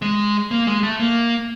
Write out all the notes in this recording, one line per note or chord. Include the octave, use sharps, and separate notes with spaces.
G#3
A#3
G#3
A3
A#3